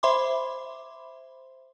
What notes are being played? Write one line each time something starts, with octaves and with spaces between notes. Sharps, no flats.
C5 E5 B5 C6 D6